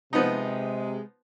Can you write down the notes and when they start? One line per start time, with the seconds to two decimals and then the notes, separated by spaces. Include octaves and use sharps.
0.13 C3 F3 G#3 B3 D#4